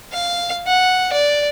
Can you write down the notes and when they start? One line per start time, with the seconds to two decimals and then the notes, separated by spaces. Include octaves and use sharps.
0.12 F5
0.67 F#5
1.12 D5